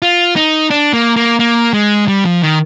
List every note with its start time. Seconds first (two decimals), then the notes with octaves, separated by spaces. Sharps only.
0.02 F4
0.36 D#4
0.70 D4
0.93 A#3
1.16 A#3
1.39 A#3
1.73 G#3
2.08 G3
2.25 F3
2.42 D#3